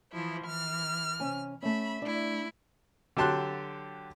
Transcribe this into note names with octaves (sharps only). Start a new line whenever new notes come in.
E3 F3 E4
E3 F6
C3 C#4 G#5
A3 C#4 E5 B5
A3 D4 E4
D3 F#3 G4 A5 C6 F#6